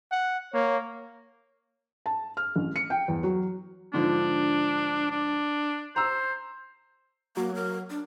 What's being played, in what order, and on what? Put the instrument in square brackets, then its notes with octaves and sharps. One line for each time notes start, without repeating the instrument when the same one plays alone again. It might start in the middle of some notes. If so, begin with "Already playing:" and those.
[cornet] F#5
[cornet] A#3 [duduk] C#5
[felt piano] A5
F6
A1
C#7
G5
E2
F#3
[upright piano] G#2 D3 F3 [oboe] D4
[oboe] D4
[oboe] C5 [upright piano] A#5 E6
[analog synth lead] F#3 [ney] A#3
[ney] A#4
D4